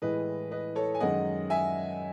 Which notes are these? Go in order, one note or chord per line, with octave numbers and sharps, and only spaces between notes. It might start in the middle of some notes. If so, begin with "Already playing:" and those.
A2 E3 G#3 B4 D#5
B4 D#5
A4 C#5
G#5
F#2 D#3 G#3 D#5 F#5
E5 G#5